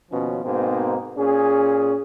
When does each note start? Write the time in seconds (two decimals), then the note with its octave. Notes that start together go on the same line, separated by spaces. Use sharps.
0.11 D#2 B2 F3 C#4
0.45 G#2 B2 A#3 C4 D#4
1.18 A#2 C#4 G#4